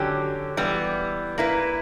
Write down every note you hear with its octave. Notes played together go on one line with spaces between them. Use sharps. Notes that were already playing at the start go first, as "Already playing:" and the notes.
Already playing: D3 F#3 C#4 G4
E3 G3 B3
A#3 E4 B4